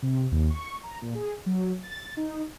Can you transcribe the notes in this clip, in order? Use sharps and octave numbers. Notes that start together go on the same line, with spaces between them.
C3
D#2
C#6
A#5
A#2
G#4
F#3
A6
D#4